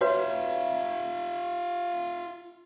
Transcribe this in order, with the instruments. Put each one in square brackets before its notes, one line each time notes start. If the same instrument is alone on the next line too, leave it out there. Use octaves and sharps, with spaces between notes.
[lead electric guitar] F4 E5 [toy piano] F#4 B4 C#5